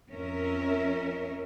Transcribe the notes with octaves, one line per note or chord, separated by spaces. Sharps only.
F2 C#4 A#4 E5